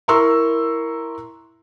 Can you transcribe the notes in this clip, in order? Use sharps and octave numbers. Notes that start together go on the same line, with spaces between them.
E4 A#4 A#5 C6 C#6 E6